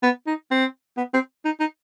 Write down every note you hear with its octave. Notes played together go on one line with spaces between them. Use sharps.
B3
D#4
C4
B3
C4
D#4
D#4